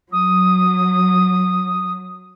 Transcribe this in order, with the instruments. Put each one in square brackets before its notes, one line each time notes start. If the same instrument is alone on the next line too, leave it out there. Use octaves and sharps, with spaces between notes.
[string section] F#3 [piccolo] D#6